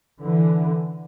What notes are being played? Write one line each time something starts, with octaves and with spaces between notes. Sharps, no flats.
D3 E3